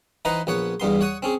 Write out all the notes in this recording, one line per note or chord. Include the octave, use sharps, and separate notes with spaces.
E3 D#4 B4 C5 F#5 A#5
A#1 B3 C#5 F#5
E2 G2 B3 C6
C#5 F#5 C#6 D#6
C4 C#4 G#4